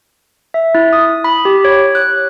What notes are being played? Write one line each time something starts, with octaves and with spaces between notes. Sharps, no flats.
E5
E4
D#6
B5
G4
C#5
F#6